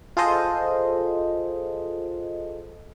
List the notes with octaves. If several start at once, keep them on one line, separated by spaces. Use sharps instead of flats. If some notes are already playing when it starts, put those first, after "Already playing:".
F4 G#4 A4 C5 D#5